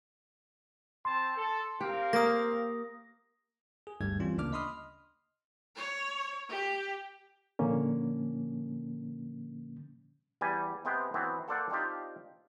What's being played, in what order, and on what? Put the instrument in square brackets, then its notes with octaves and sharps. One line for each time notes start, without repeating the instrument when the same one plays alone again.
[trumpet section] C4 A5 [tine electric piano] C6
[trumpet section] A4
[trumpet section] C4 A#4 F5 [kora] G4
[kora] A#3 [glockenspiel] D#6 A#6
[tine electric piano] G#4
G1 D2 G2 G3 G#6
E3 G3 C4 C#4 F4
D2 C#3 A#3 D4 D6 F6
D#5 B5 C6 D#6 F6
[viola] C#5
G4
[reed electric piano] A#2 D3 F3 A#3 C#4
[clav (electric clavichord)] E2 G3 G#5
C3 G#3 B3 C5 G5 A#5
E3 F#3 B3 C4
A#3 A4 C5 D5 F5 F#5
C4 D4 D#4 F4 G4